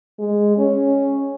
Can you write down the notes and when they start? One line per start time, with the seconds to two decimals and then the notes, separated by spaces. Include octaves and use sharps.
0.19 G#3
0.57 C#4